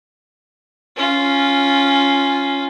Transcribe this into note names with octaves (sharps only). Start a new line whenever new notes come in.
C#4 F4